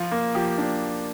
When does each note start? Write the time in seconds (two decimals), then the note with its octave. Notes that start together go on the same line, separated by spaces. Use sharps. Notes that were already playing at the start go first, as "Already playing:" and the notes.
Already playing: F3 F4
0.11 A#3
0.35 F3 G4
0.58 D4